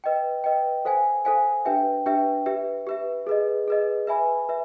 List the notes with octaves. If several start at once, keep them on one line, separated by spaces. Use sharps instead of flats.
B4 D#5 G5
B4 D#5 G5
A4 C5 F5 G#5
A4 C5 F5 G#5
D4 G4 B4 E5 G5
D4 G4 B4 E5 G5
G4 B4 E5
G4 B4 E5
G#4 B4 D#5
G#4 B4 D#5
B4 E5 G#5 B5
B4 E5